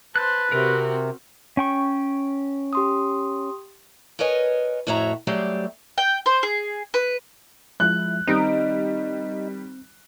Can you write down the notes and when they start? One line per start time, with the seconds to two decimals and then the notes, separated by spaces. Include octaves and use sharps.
0.16 B4 C5 A5 F#6
0.52 C3 C4 F#4 A#4
1.57 C#4 G5 C#6
2.73 G4 C6 D#6
4.19 A#4 B4 C#5 D#5 G#5
4.87 F2 A2 F#4 C#5 E5 A#5
5.27 F#3 G3 A3 G4 G#4 C5
5.98 G5
6.26 C5
6.43 G#4
6.94 B4
7.80 F3 G#3 E4 F#6
8.27 D#3 G3 C4 D#4 D7